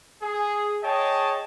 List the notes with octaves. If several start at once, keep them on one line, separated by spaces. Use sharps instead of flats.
G#4
G#4 C#5 D#5 G5 A5